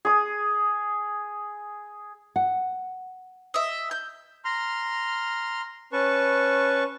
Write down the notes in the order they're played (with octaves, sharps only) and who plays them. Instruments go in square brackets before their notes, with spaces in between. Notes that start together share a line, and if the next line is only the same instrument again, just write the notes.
[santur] G#4 D#6
[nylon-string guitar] F#5
[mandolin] D#5 E5
G6
[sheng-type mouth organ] A#5 C6 F6
C#4 B4 A5 C#6